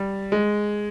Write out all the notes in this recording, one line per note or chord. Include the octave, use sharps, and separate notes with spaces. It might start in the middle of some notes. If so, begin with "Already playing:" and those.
Already playing: G3
G#3